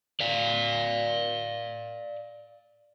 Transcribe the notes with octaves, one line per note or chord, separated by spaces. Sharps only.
D5 F5